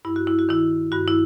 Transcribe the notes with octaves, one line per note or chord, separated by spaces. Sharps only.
G2 E4
F#4
E4
F#4
D#3 E4
G2 F#4
E4